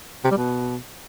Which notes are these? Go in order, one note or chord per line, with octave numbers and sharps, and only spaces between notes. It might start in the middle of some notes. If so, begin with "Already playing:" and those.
C3
G3
B2